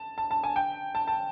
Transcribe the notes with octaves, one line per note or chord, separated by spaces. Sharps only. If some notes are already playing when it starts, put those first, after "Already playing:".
Already playing: A5
A5
A5
G#5
G5
A5
A5